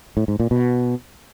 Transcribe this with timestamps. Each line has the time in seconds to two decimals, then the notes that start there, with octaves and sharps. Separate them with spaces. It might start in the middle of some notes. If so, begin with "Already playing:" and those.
0.17 A2
0.28 G#2
0.40 A#2
0.51 B2